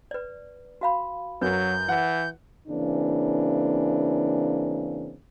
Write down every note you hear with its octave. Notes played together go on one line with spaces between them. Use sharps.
B4 D5
F#4 F5 B5
F#2 F#3 B4 G6
E3 F#5
C#3 E3 A#3 C4 D4